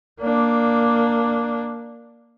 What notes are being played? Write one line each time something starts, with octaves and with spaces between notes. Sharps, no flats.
A#3 D4